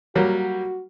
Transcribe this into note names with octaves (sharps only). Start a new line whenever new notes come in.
F#3 G3 A#3 F#4